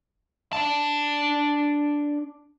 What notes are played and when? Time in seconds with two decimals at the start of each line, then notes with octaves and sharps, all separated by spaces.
0.53 D4 A5